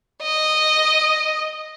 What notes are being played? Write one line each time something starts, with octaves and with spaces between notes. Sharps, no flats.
D#5